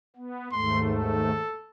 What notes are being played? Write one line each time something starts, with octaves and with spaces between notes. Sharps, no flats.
B3
D#2 G#2 A3 C6
A4